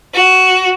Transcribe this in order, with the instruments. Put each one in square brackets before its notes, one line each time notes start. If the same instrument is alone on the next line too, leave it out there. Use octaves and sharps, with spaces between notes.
[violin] F#4